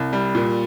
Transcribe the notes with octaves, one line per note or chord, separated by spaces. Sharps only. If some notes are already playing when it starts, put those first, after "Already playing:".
Already playing: C2
G3
A#2